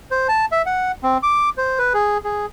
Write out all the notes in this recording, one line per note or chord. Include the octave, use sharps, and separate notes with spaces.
C5
A5
E5
F#5
C4
D6
C5
B4
G#4
G#4